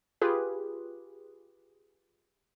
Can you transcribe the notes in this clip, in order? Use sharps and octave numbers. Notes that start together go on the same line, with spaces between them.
F4 G4 G#4 B4